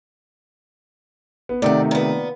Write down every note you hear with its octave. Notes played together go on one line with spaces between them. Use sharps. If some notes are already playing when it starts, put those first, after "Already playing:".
B3
C3 D#3 A3 D5 F#5
A#2 B3